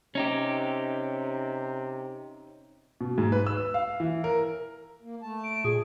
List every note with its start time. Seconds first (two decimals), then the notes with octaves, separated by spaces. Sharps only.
0.15 C3 C#4 D#4 G4
3.01 B2
3.18 G#2
3.32 B4
3.47 E6
3.74 F5
4.00 E3
4.24 A#4
5.02 A#3
5.23 A3 A5
5.43 D7
5.64 A#2 G#4